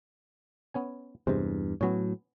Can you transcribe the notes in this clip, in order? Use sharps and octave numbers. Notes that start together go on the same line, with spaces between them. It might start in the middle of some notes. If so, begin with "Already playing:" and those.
B3 C#4 G#5
E2 G2 C3 G#3 C5
A2 F#3 B3 C#4 C#5